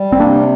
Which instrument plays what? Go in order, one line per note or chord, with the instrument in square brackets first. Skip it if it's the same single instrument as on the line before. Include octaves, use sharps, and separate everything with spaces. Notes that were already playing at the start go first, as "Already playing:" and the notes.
Already playing: [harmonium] G3
[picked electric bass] C4
[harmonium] C3 [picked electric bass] A#3 D4